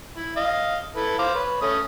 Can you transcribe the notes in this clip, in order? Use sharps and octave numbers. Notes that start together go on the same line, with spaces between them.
E4
D#5 F5
E4 A4 B4
C5 F5 D6
B4 C#5
A3 C#4 D#6